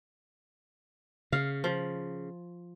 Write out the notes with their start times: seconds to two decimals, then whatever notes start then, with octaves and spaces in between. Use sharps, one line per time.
1.32 C#3 F5
1.64 F3